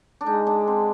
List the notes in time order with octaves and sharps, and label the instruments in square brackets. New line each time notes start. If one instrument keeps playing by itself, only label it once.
[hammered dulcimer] D4
[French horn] G#3 [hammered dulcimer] D#4
[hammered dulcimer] D4
C4